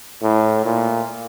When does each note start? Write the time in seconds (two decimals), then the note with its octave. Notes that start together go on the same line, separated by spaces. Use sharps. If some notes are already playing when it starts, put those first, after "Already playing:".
0.23 A2
0.65 A#2